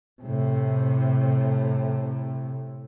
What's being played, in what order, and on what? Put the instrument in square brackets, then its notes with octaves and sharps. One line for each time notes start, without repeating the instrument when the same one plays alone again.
[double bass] A2 C3